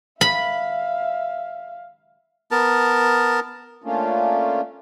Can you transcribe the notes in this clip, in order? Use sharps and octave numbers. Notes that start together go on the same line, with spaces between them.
E5 F5 B5
B3 A#4 A5
A3 A#3 C#4 D4 F4